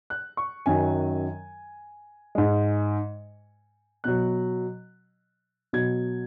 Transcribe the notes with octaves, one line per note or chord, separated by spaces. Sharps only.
F#6
C#6
F#2 D#3 F#3 G#5
G#2 G#3
B2 F#3 F#6
B2 F#3 G#6